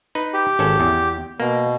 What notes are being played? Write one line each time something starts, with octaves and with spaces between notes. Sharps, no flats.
D#4 B4
G4
G#1 C#4 A4
E2
B2 A#3